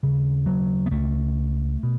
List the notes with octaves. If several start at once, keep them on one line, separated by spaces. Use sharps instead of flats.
D#2 C#3
F#3
B3
C#2 C#3 A3
B2